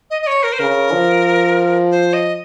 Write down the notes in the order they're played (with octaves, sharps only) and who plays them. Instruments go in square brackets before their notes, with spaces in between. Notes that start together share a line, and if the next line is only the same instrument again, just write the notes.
[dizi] D#5
D#5
C#5
A#4
C5
[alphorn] C#3 [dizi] A#4
[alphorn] F3
[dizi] C5
D#5